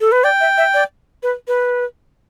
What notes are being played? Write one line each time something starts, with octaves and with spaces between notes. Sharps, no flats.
A4
B4
D5 G5
E5
E5
D5
B4
B4